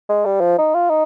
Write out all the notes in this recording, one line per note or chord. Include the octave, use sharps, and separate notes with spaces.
G#3
G3
F3
D#4
F4
D#4